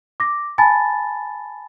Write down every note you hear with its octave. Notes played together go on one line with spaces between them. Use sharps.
D6 A#6
G#5 A5 B5 A6